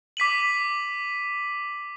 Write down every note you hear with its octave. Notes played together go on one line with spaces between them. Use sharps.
D6 B6 D#7 F#7